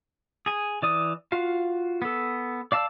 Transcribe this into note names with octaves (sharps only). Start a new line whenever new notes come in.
G#4 G#5
E3 D5 D#6
F4 F#4 F5
B3 A4
D5 F5 A5 E6